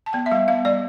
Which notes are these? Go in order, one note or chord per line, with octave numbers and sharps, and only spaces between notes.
A5
B3 G5
E5
G3 F5
B3 F5
G3 D5